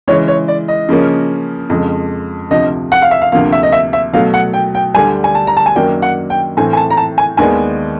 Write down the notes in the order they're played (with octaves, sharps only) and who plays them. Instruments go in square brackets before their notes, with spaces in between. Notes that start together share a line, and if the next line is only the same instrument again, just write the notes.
[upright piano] C#3 E3 G#3 [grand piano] C#5
[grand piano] C#5
D5
D#5
[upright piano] C#3 F3 A#3 C#4
F2 C#3 F3 G#3
[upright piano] D2 C3 F3 [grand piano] D#5
[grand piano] F#5
F5
E5
F5
[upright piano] D2 C3 F3 A#3 [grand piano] F5
[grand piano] E5
D#5
E5
E5
[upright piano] B2 F#3 A3 [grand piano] F5
[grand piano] F#5
G5
G5
[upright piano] D2 D3 G3 [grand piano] G#5
[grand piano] G#5
A5
A#5
A5
G#5
[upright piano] F#2 D#3 F#3 A#3 D4 [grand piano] G5
[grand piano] F#5
G5
[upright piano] A2 E3 A3 C4 [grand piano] G#5
[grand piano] G#5
A5
A#5
A5
G#5
[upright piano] D#2 D#3 G#3 B3 D4 [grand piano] G#5